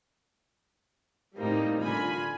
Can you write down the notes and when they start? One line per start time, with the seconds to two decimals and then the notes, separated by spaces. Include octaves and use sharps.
1.36 A2 G3 A#3 C4 D#4
1.79 D3 F4 G#5 B5